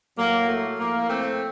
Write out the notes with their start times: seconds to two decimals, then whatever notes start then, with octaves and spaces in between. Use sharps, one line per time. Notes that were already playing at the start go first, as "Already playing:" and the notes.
0.17 A2 F#3 A#3
0.48 A3
0.78 A2 F3 A#3
1.09 A3 C4